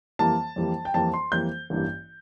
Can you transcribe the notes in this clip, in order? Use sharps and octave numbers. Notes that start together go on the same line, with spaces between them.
F2 E3 G3 A#3 A5
F2 E3 G3 A#3
G5
F2 E3 G3 A#3 A5
C6
F2 E3 G3 A#3 G6
A1 G2 E3 A#3